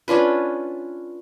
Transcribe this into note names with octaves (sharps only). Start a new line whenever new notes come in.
C#4 D4 F4 B4